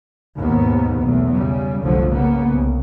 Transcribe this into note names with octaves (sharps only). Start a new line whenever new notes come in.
D#2 G#2 B2 A#3 B3
B1 E2 A2
C#3 G3
F1 C2 G2 D3 F3 F#3
C#3 A#3 B3
C2